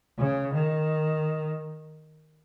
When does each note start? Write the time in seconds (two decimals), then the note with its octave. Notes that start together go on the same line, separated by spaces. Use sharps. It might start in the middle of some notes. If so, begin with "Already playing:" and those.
0.18 C#3
0.53 D#3